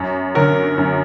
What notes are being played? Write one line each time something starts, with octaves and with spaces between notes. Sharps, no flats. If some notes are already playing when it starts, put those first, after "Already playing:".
Already playing: F#2
D3 F#3 A#4
F#2